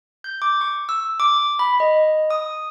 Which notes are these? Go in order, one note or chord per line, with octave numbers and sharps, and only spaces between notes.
G6
D6
C#6
E6
D6
B5
D#5
D#6